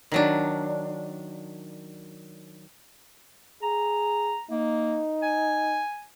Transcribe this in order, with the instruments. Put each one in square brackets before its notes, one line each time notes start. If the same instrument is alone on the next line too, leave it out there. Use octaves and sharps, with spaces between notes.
[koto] D#3 F#3 D4
[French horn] G#4 [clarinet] A#5
[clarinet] A#3 [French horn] D#4
[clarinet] G#5